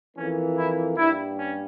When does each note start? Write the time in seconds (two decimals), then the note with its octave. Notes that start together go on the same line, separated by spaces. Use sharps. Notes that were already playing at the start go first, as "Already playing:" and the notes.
0.15 F2 E3 A#3 C#4
0.56 E4
0.96 G2 G3 A#3 E4
1.37 C#4